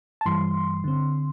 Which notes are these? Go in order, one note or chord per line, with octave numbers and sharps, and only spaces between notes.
A5
G2 E3 G3 C6
D3 C4